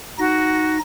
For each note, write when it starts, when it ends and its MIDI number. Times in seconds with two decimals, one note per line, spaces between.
0.18 0.79 63
0.18 0.76 66
0.18 0.79 94